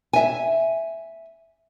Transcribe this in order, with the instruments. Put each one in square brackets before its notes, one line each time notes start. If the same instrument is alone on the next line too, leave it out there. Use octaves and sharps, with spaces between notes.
[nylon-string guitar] E5 G#5